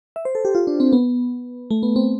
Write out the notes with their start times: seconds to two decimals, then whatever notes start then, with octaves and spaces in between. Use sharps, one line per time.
0.16 E5
0.25 C5
0.35 A4
0.45 G4
0.55 F4
0.67 D4
0.80 C4
0.93 B3
1.71 A3
1.83 B3
1.96 C4